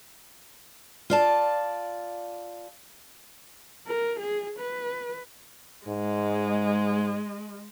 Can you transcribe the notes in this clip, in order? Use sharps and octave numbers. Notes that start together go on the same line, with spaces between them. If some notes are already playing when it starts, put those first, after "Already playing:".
F4 D5 A5
A#4
G#4
B4
G#2 G#3